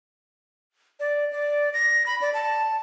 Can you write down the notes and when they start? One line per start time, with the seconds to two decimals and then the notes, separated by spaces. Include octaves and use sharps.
1.00 D5
1.32 D5
1.74 A#6
2.06 B5
2.21 D5
2.34 A5